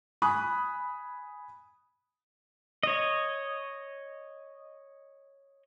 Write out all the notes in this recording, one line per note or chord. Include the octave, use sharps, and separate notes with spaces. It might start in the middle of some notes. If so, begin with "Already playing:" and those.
G#5 B5 D#6 F#6
C#5 D#5